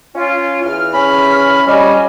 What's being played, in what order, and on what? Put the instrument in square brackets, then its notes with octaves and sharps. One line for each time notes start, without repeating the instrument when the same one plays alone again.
[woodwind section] C#4 F4
E2 F6
[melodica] C#4 B5
[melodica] G3 C#4 [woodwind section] F4 D#5 G#5